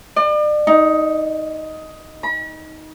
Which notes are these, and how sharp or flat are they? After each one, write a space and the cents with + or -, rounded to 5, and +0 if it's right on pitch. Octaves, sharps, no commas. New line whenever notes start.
D5 +40
D#4 +10
B5 -45